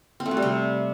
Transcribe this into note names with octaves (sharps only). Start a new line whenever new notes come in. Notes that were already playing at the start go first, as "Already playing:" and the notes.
C4
A3
F#4
G3
C3